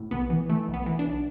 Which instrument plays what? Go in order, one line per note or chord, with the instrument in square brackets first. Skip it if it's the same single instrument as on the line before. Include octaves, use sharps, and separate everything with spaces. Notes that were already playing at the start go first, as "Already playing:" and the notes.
Already playing: [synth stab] A2
B1 B3
E3
E3 A3
B1
B3
E3
D4
B1